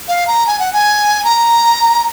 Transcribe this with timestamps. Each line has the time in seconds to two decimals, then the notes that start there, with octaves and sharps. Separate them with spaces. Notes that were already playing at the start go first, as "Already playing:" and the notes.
0.08 F5
0.27 A#5
0.47 G#5
0.59 F#5
0.73 G#5
1.24 A#5